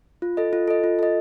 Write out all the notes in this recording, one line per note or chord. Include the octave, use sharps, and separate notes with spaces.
F4
A4 D#5
F4
A4 D#5
F4
A4 D#5